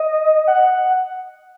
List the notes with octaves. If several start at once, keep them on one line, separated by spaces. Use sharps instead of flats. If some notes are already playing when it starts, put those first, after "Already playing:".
Already playing: D#5
F#5